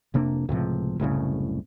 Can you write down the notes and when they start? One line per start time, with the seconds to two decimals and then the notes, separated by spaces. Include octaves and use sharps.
0.14 F1 C3 A#3 D4
0.49 C#2 A2 C3 F3
1.00 F#1 C2 A2 C#3